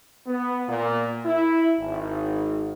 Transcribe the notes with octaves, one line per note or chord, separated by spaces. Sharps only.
B3
A#2
E4
G#1